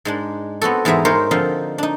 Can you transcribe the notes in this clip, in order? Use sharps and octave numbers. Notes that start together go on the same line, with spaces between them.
G#2 G#3 D4
B3 C4 F#4 A4
E2 G#2 B3 G#4 E5 A#5
G#2 D#4 A#4 C5 C#5
D3 F3 C4 D#4 F5
D4 D#4